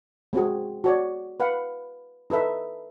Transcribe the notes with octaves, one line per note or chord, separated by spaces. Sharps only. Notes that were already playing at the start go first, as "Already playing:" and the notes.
G#3 C4 F#4 G#4
F#4 C#5 D5
B4 F5 F#5
D#4 A4 B4 E5